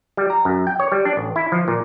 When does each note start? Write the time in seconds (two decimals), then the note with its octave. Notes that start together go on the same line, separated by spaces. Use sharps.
0.17 G3
0.30 A#5
0.45 F#2
0.67 G5
0.80 C#5
0.92 G3
1.05 D4
1.17 A1
1.36 E4
1.52 F3
1.68 A#2